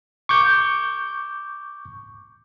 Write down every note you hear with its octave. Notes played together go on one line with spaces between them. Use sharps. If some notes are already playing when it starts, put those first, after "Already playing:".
C#6 D6 G6